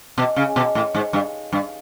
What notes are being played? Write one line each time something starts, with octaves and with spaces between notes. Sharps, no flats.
B2
C#3
B2
A2
G#2
G2
G2